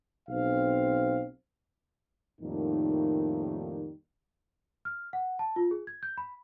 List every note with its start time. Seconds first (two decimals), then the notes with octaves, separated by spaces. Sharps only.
0.29 B1 C4 F5
2.41 F2 A2 D#3 G3 A#3 D#4
4.85 F6
5.13 F#5
5.39 A5
5.56 F4
5.71 G#4
5.87 G#6
6.03 G6
6.18 B5